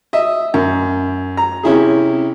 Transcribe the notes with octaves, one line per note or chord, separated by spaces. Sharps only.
D#5 E5
F#2
A#5
C3 C#4 E4 G#4